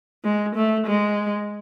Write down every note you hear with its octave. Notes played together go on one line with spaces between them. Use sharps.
G#3
A3
G#3